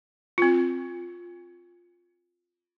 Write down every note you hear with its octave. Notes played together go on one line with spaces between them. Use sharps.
C4 F4